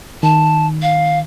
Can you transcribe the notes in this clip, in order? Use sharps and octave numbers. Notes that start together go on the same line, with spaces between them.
D#3 A5
F5